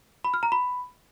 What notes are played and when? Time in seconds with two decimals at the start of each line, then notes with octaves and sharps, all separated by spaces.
0.24 B5
0.34 F6
0.43 A#5
0.52 B5